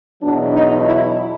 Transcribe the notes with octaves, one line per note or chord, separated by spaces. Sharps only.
E2 B2 F#3 D4
D#4
E4